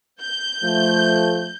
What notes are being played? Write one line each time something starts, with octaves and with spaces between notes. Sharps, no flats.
G6
F3 A3